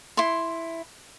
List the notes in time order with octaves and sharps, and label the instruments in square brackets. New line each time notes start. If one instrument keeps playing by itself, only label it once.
[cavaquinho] E4 C6